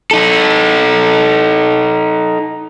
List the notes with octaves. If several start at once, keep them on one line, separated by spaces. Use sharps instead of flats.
D#4 A4